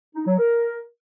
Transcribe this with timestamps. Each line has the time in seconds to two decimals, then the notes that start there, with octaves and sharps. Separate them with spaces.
0.15 D#4
0.26 F#3
0.38 A#4